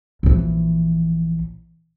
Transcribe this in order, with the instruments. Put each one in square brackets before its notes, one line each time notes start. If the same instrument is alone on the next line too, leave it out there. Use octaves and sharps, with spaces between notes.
[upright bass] A#1 E3